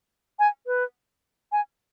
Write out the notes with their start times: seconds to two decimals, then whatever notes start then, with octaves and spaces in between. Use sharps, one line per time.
0.39 G#5
0.67 B4
1.52 G#5